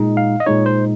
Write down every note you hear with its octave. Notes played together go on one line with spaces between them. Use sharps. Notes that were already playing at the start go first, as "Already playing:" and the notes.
Already playing: A#2 G#3 D#4
F5
D#5
A#2 G#3 D#4 C#5
C5